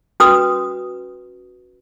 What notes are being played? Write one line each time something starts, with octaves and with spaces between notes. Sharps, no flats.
C#4 F#4 B4 D#6